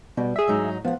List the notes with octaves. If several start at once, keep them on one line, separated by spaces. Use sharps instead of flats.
B2 G3
G#4 E5
G#2 F#3 D#4
F3 B3 F#5